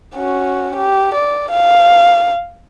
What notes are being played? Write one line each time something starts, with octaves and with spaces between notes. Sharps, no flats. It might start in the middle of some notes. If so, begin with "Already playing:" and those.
C#4 F#4
G4
D5
F5